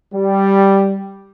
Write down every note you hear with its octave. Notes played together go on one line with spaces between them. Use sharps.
G3